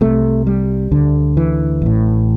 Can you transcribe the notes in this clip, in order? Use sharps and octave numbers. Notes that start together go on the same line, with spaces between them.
C2 C3 A3
G3
D2 D3
E3
A1 A2